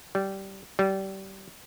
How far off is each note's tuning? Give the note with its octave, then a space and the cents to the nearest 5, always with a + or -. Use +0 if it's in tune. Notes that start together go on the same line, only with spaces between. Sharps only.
G3 -15
G3 -25